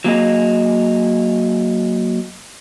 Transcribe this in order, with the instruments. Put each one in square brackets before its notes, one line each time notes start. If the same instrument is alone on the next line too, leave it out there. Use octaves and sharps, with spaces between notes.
[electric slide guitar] F#3 A#3 G#4 D#5